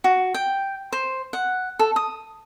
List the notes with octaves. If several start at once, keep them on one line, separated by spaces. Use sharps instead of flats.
F#4
G5
C5
F#5
A4
D#6